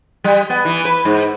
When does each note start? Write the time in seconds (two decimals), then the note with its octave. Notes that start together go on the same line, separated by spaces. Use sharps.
0.24 G3
0.50 B3
0.65 E3
0.85 B4
1.05 G#2